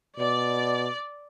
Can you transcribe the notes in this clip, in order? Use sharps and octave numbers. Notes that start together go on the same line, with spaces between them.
B2 D5